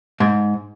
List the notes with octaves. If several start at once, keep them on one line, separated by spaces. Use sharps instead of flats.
G#2